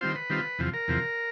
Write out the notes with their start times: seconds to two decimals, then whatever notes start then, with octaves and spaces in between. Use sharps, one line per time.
0.01 D#3 G3 C4 F4 C5
0.15 B4
0.30 D#3 G3 C4 F4
0.59 E2 C3 F3
0.74 A#4
0.88 E2 C3 F3